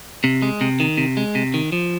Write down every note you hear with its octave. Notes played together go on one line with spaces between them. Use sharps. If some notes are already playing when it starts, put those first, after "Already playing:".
C3
G#3
C3
D#3
C3
G#3
C3
D#3
F3